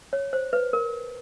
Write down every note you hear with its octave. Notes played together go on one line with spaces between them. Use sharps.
C#5
C5
B4
A#4